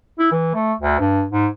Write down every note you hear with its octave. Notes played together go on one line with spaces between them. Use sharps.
E4
E3
A3
D2
G2
G#2